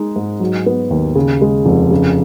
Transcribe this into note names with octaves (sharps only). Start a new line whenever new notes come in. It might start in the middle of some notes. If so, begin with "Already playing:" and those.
Already playing: G#3 D#4
G#2
F#3
B3
D#2
C#3
G#3
F1
C#3